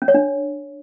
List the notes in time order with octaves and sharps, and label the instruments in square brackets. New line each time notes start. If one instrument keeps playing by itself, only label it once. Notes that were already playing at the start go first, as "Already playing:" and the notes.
[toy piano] C#4
C#5
D4